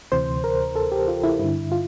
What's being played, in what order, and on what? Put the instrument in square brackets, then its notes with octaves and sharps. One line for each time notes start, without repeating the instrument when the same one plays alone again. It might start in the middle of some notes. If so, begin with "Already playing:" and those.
[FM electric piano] D2 C3 E3 C5
A#4
A4
G4
F4
E4
G2 D3 E4
F4